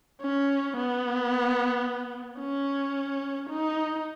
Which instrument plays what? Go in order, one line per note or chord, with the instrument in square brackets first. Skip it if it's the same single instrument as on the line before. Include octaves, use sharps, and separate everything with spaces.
[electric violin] C#4
B3
C#4
D#4